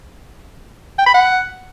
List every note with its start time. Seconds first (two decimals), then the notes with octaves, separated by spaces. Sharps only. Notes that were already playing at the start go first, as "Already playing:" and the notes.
0.99 G5
1.06 B5
1.14 F#5